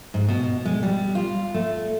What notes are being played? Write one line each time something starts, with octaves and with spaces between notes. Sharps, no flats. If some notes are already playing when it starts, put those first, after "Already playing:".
G#2
B2
G#3
G3
F4
A3